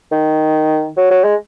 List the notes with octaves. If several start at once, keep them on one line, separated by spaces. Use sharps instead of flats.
D#3
F#3
F#3
G#3